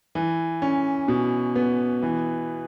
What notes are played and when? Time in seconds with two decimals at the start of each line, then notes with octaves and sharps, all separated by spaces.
0.15 E3
0.62 C#4
1.08 B2
1.56 B3
2.02 E3